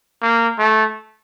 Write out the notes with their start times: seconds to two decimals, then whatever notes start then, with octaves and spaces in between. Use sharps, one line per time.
0.22 A#3
0.59 A3